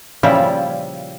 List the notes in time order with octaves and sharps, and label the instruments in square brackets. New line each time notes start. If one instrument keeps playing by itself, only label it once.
[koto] A#2 C#3 F3 G3 E4